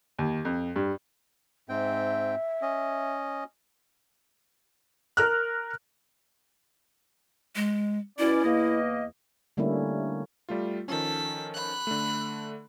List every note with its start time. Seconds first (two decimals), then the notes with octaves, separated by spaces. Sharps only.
0.19 D#2
0.45 F2
0.76 G2
1.69 G#2 C4 E5 G5
2.62 C#4 D#5
5.17 A#4 F6 F#6
7.55 G#3
8.19 B2 C#4 E4 D5
8.44 E2 A#3 D#5
9.57 D3 G3 A3 A#3 C#4 E4
10.49 G3 A3 F4
10.88 D#3 F3 C#4 A4 B6
11.54 B5 F#6
11.87 D3 A3